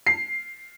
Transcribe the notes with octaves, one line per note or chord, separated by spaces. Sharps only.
C7